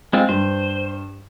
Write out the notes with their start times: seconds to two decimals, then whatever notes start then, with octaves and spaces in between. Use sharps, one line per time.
0.13 G#3 C4 F4
0.29 G2 C5